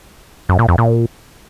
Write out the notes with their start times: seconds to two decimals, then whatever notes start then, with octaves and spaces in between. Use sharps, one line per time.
0.49 F#2
0.59 A#2
0.68 F2
0.78 A#2